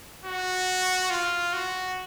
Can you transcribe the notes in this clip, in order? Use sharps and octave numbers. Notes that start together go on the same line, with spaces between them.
F#4
F4
F#4